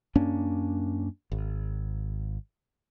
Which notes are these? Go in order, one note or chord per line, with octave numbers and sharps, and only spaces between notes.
F#2 A#3 C#4 D4
G#1